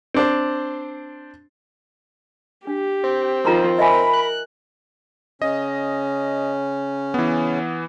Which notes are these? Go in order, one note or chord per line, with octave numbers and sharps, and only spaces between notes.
C4 D4 C5
D4 G4
C4
D#3 F3 F4 A#5 C6
A#4 D#5 E5 G#5 B5
F#6
C#3 C#4 D#5
E3 B3